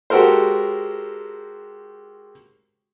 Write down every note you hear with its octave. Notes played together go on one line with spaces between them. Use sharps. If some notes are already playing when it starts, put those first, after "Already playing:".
G#3 F#4 G4 A4 A#4 C5